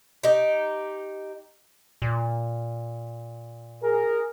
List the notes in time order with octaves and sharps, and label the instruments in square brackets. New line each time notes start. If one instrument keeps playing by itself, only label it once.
[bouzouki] D#4 G4
[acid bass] A#2
[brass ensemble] G#4 A#4